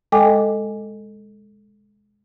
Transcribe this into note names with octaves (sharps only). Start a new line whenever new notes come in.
G#3 A4 D#5 G5 G#5 D6